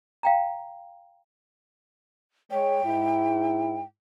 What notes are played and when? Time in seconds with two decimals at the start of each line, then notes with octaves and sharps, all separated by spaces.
0.23 F5 G5 A#5
2.51 G#3 C#5 G5
2.85 G#2 E4